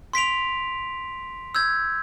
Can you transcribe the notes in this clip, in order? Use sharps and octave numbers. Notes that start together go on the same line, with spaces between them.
C6 B6 D7 F7
E6 G6 G#6